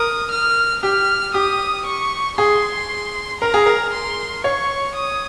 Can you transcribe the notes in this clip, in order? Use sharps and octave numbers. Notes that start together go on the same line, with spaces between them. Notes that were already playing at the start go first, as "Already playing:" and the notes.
Already playing: A#4 D#6
F6
G4 F6
G4 D#6
C#6
G#4 C6
A#4 A#5
G#4
A#4
C6
C#5 C#6
D#6